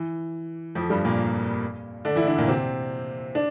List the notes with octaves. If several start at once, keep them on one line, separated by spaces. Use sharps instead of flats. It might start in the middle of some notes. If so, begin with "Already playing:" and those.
Already playing: E3
F2 F3
G2 G3
A#2 A#3
D3 D4
E3 E4
D3 D4
A#2 A#3
C3 C4
D4